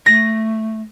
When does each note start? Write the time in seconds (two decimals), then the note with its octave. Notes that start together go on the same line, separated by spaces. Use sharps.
0.06 A3 A#6